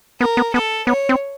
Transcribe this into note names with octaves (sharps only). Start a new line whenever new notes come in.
B3 A#4
B3
B3 A4
B3 C#5
C4